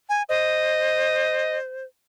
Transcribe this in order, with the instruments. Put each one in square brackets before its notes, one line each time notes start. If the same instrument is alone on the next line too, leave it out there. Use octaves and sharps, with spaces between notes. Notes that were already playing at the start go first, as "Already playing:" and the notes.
[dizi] G#5
[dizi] C5 [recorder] D#5